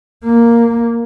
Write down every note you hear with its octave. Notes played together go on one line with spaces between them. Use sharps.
A#3